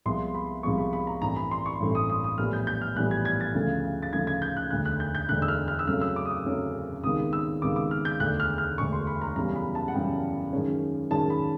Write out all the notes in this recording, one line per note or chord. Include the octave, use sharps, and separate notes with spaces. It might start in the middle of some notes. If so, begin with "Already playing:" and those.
C2 C3 F3 G#3 B3 C6
B5
C2 C3 F3 G#3 B3 C#6
B5
B5
A#5
A1 G2 E3 A3 C4 A#5
B5
C6
C#6
A1 G2 E3 A3 C4
D#6
D#6
D#6
A#1 A2 E3 G3 B3 F6
G6
G6
F6
A#1 A2 E3 G3 B3 F#6
G#6
G#6
A6
D2 C#3 F3 A3
A6
D2 C#3 F3 A3 G#6
G#6
G6
F#6
E1 D2 D3 F#6
F#6
G6
G6
E1 D2 D3 F#6
E6
F6
F6
E6
F#2 C#3 F#3 A3 C4 F6
E6
D6
D#6
D6
F#2 C#3 F#3 A3 C4
C#2 C3 D#3 G#3 B3 D#6
E6
C#2 C3 D#3 G#3 B3 D6
D6
F6
G6
E1 D2 D3 F#6
F6
F6
E1 D2 D3 C#6
C6
B5
A#5
F#2 C#3 E3 G3 B3 A#5
B5
A5
F#5
F#2 C#3 E3 G3 B3 G5
F#2 D#3 G#3 C#4
F#2 D#3 G#3 C#4 A5
B5